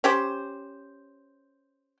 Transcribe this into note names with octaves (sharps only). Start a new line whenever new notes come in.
C#4 G4 C5